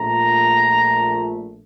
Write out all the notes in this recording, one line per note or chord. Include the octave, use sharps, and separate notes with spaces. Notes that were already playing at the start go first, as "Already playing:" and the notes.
Already playing: A#1 A#2 A3 A#5